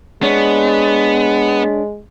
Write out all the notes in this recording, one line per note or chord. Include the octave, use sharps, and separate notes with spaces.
G#3 B3 D4 C#5